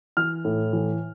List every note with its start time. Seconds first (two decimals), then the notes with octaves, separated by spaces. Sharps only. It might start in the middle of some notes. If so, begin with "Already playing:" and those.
0.17 E3 F6
0.45 A2
0.73 E3